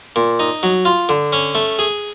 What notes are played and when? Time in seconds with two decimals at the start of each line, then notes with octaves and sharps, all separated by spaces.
0.16 A#2
0.40 D#4
0.63 F#3
0.85 F4
1.09 D3
1.33 C#4
1.55 A3
1.79 G#4